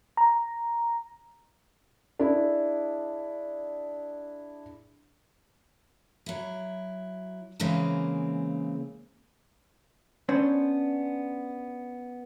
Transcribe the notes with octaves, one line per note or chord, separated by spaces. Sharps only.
A#5
D4 E4 G#4
F#3 E4
C#3 E3 G#3 A#3 C4
B3 C#4 D4 C5